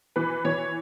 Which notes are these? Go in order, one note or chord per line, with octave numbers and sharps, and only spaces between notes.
E3 B4
E3 C#5